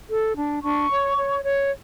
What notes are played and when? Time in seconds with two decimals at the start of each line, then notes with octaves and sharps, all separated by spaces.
0.08 A4
0.36 D4
0.62 D4 C#6
0.90 C#5
1.16 C#5
1.44 C#5